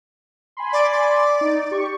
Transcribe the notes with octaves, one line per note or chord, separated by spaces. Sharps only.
G#5 B5 C6
D5
D5
D#4
G4 C#6